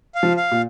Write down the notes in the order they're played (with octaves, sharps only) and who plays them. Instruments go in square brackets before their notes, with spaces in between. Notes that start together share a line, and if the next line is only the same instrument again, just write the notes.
[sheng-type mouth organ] F5
[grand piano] F3
[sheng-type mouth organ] F5
[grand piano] A#2